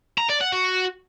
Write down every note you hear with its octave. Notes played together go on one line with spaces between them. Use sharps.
A#5
D5
F#5
F#4